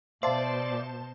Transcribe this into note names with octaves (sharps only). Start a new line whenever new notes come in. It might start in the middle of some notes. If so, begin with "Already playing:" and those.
B2 C5 D5 E5 F5 A5